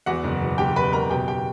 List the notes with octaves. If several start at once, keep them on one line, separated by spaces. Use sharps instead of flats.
E2 F#4 F#5
F#1
B2
F#1 G4 G5
E2 B4 B5
F#1 A#4 A#5
B2 G4 G5
G4 G5